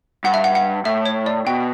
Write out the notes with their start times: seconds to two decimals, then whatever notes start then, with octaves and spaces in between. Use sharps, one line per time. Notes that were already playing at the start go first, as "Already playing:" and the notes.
0.24 G2 F#5
0.34 E5
0.44 F#5
0.55 F#5
0.85 A2 E5
1.06 C#5
1.26 D5
1.46 B2 G5